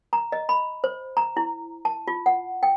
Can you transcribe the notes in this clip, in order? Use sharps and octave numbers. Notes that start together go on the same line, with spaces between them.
A#5
D#5
B5
C5
A#5
E4
A5
F4
F#5
G5